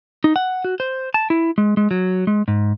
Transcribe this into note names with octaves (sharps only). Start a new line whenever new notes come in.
D#4
F#5
F#4
C5
A5
E4
G#3
G#3
F#3
G#3
G#2